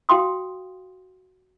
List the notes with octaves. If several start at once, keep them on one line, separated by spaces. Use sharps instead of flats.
F#4 F5 G5 C6 D#6